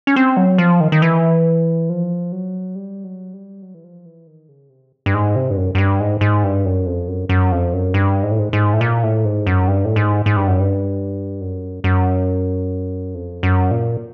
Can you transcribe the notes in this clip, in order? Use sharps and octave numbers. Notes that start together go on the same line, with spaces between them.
C#4
C4
F#3
F3
D#3
D#3
E3
F3
F#3
G3
F#3
G3
F#3
E3
F3
E3
D#3
C#3
C3
G2
G#2
C3
G2
F#2
F#2
G2
G#2
G#2
G2
F#2
F2
F#2
F#2
F2
F#2
G2
G#2
A2
G#2
G#2
A2
A#2
A2
G#2
F#2
G2
A2
G#2
G#2
G2
F#2
G2
F#2
F#2
F2
F#2
A#2